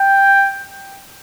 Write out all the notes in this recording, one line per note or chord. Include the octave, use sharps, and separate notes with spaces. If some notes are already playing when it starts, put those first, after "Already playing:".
Already playing: G5